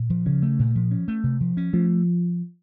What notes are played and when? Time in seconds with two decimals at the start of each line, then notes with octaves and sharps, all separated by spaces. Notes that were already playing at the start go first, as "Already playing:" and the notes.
Already playing: A#2
0.10 F3
0.26 C#3 C#4
0.42 A3
0.59 A#2
0.75 F3
0.91 C#4
1.08 A3
1.24 C3
1.41 F3
1.57 C#4
1.73 F3 A3